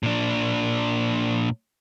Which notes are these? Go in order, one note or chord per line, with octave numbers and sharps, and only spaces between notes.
A#2 D4